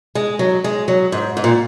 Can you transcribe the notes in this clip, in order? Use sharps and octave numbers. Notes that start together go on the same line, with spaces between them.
G#3
F#3
G#3
F#3
G#2
G#2
A#2